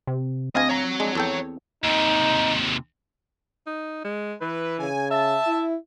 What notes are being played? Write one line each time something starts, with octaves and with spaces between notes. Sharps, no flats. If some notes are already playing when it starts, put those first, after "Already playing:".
C3
D2 C4 D#5 F5 G#5
C#5 A#5
G#3 D4
E2 A4 G5
D#2 C3 D#4
D#4
G#3
E3 B4
C#3 G#5
E5 A5
E4